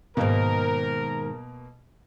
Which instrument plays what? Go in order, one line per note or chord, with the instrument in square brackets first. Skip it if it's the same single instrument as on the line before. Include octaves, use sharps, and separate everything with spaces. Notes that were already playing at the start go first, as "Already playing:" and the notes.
[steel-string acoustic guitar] G#2 D#3 [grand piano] B2 A#3 [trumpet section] A#4